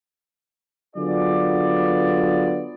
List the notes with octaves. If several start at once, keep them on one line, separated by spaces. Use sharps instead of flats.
D3 F#3 B3 F4 G#4 D5